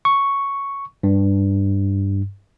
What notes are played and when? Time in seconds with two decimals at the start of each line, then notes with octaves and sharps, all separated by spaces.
0.05 C#6
1.03 G2